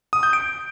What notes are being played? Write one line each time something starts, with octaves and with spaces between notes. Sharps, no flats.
D#6
G6
D7